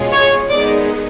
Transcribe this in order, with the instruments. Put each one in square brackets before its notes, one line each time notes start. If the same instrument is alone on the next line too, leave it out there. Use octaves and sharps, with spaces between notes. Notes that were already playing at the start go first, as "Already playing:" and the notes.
Already playing: [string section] B2 G#3 C#4 F4
[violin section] C#5
[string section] D#3 G#3 B3 D#4 [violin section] D5